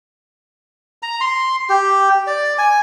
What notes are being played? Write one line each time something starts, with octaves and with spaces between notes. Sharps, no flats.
A#5
C6
G4
D5
G#5